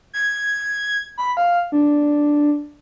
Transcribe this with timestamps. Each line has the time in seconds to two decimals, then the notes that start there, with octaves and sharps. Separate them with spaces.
0.13 G#6
1.18 B5
1.37 F5
1.72 D4